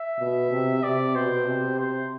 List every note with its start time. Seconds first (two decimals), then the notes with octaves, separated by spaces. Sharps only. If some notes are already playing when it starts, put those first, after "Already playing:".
Already playing: E5
0.20 B2
0.52 C3
0.83 C3 D5
1.15 B2 C5
1.47 C3
1.79 C5